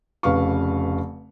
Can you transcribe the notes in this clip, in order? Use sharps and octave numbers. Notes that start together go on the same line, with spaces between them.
F1 C#3 B4 F5 C#6